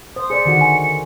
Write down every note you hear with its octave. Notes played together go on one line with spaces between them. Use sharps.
C5 D#6
G#4 C5 D5 C#7
D3 D#3 F#4
G#5